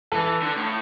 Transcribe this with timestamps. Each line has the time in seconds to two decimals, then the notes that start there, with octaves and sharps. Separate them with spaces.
0.12 E3 A4
0.42 D3
0.57 A2